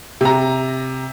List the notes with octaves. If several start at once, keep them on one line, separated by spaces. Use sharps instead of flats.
C3 A#5